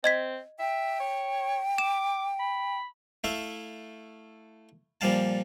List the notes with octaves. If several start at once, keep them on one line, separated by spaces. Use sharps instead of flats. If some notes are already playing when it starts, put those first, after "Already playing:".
C4 D#5 G#6 B6
E5 G5
C#5
D6 E7
B5
A3 E4 E5 F5
A#2 F3 G3 F5 A5